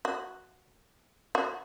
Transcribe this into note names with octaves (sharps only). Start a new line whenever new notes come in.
F#4
F#4